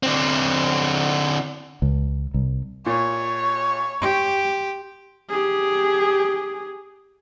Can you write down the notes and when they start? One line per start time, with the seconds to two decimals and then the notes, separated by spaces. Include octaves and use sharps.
0.03 D3 C4
1.82 C#2
2.34 C2
2.86 A#2 C#5
4.02 G4 C6
5.29 G4 G#4